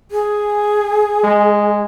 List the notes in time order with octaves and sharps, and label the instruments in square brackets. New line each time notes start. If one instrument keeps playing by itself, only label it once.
[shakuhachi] G#4
[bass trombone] G#3